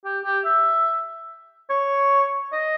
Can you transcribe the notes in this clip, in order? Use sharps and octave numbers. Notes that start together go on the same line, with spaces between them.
G4
G4
E5
C#5
D#5